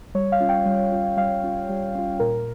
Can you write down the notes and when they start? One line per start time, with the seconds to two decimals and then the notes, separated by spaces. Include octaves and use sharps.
0.15 G3 C#5
0.32 F5
0.40 C#4 F4
0.49 G5
0.65 G3
0.92 C#4 F4
1.17 G3 F5
1.43 C#4 F4
1.69 G3
1.95 C#4 F4
2.20 A#2 A#4